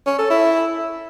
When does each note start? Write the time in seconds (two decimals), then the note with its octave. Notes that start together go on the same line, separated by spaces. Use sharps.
0.06 C#4
0.18 A4
0.30 E4